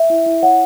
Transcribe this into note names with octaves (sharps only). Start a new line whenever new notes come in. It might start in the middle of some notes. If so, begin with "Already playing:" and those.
Already playing: E5
E4
E4
C#5 F#5